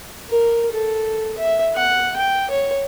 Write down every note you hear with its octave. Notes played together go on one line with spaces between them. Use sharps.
A#4
A4
E5
F#5
G5
C#5